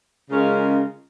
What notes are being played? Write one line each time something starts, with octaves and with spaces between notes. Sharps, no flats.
C#3 G#3 C#4 F4 A#4